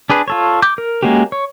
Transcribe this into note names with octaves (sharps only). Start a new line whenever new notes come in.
D4 G#4 B4
F4 A4 C#5
D6 G6
A#4
G#3 A#3 C#4 F#4 G4
C#5